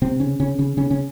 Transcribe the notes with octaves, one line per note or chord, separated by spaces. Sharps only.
C3 C4
C#3 C#4
C#3 C#4
C#3 C#4
C#3 C#4
C#3 C#4